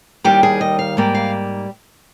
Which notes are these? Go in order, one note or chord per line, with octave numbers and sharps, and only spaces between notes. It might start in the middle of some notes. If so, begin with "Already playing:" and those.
D#2 D#3 G3 G4
G#4
D#5
F5
G#2 G3 A#3
F5